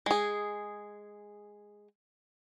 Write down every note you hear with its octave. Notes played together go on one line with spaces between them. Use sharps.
G#3 G#4